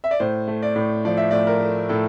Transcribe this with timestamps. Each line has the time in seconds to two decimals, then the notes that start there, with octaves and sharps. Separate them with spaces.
0.04 E5
0.11 D5
0.20 A2 C5
0.48 A3
0.62 D5
0.76 A2
1.05 F3 D5
1.17 E5
1.31 A2 D5
1.47 A#4
1.61 A3
1.89 A2 A4